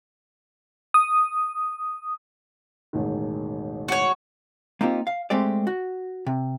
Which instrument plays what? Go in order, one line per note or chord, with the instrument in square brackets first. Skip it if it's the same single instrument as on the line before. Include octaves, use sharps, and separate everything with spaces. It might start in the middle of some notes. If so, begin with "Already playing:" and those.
[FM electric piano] D#6
[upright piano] E1 A1 D#3
[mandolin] F#4 C#5
[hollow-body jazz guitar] A#3 C4 D#4 F4 G4
F5
G#3 A3 C4 G4 D5
F#4
C3